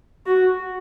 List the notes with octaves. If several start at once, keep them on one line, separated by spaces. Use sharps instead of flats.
F#4